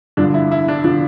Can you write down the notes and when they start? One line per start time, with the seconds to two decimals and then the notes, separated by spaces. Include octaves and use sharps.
0.17 G2 D3 F3 D4
0.34 E4
0.51 E4
0.68 D4
0.84 D3 F3 D4